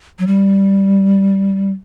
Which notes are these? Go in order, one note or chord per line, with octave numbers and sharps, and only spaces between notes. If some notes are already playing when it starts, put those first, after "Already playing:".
F#3
G3